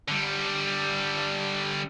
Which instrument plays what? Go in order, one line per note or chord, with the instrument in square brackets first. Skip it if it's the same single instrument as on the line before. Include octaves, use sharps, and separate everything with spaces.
[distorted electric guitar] D3 G3